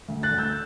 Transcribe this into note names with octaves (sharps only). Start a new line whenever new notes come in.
D2
F#6 A6
D2
E6 G6